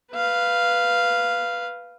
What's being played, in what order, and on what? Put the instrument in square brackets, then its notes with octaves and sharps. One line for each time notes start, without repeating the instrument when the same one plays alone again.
[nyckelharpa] B4 F5